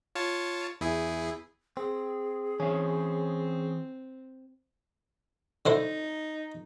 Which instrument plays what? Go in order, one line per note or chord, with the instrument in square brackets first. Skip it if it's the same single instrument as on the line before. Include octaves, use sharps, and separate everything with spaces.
[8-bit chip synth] F4 C#5 A5
E2 E4 G#4
[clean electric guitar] C4 [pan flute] G#4
[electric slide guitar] E3 C#5 F5 [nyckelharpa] C4 [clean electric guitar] C#4
[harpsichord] D3 E4 C5 [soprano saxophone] D#4